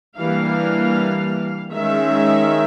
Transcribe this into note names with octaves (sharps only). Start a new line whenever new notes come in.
E3 G3 A#3 D4 F5
D#3 G#3 C#4 E5